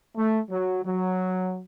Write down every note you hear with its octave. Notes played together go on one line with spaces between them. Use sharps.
A3
F#3
F#3